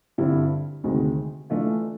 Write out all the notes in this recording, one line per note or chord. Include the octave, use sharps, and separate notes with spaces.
G2 D3 G3 C4 E4
D2 C3 D#3 G#3
E3 A3 D4 F4